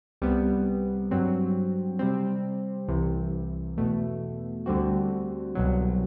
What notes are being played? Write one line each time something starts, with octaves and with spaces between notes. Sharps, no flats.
C2 C3 G3 B3
G2 F#3 C4
C3 G3 C4
C2 C3 E3
E2 B2 A3
D2 D3 G3 C4 F#4
C2 B2 F#3